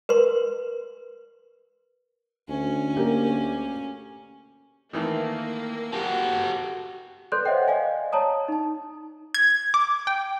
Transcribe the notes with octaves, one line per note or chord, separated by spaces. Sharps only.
A#4 B4 C6
D2 C#4
A#3 G4 A#4
D#3 E3 A3 A#3
F#4 G4 A4
A4 B4 D5 C6 F#6 G6
C5 C#5 D#5 E5 F#5 G5
D5 D#5 F5 G#5
C#5 A5 A#5 D#6
D#4 A5
G#6
D6
G5